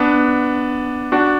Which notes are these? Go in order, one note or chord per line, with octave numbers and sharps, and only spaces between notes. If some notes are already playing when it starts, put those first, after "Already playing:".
Already playing: B3 D4
D4 F#4